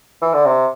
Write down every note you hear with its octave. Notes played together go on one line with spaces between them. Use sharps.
E3
D3
C3